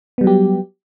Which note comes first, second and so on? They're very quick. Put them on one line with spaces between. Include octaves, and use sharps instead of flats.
B3 G3 F#3 G4